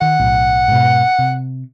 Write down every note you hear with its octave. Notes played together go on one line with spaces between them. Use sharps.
D#3 F#5
B1 A2
G#2 B2
C3